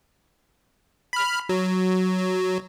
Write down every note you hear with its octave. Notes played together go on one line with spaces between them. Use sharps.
B5 F6
F#3